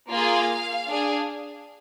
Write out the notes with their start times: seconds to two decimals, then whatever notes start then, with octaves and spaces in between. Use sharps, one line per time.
0.12 A#3 F4 G#4 F5
0.87 D4 G#4